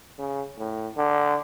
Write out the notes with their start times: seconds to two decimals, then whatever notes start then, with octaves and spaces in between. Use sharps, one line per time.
0.18 C#3
0.58 A2
0.97 D3